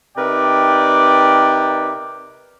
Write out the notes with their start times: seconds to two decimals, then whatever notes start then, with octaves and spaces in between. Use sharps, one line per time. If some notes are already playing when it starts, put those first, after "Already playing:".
0.17 C3 D#4 A#4 B4 D5 G5